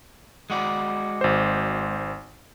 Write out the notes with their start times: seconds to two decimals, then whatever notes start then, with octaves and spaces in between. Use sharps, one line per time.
0.50 G#3 F#4 D5
1.21 G#1 C5